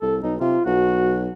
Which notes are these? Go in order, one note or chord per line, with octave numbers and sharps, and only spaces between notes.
C2 A4
B1 D#4
C3 F4
B1 F#4